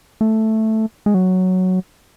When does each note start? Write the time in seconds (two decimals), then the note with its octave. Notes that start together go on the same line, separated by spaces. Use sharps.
0.21 A3
1.06 G#3
1.14 F#3